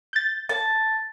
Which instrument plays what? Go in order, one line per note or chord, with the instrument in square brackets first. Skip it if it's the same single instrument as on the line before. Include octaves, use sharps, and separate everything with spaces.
[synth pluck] G6 A6
[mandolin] A5